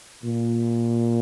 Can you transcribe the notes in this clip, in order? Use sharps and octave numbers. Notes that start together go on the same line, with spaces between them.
A#2